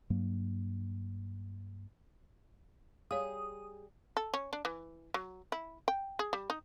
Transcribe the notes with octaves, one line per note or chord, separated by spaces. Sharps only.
G2 F#3 A#3
G3 G#4 C#5 F5 D#6
A4
C#4
D4
E3
F#3
E4
G5
G#4
G3
D#4